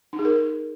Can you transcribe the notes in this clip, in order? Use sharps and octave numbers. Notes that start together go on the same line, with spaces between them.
D#4
G#4
A#4